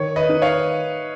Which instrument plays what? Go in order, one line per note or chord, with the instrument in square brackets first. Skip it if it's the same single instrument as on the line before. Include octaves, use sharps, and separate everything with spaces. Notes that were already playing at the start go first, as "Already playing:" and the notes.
Already playing: [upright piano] D#3 [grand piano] C#5
[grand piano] B4 D#5
[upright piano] D#4
[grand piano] C#5 F5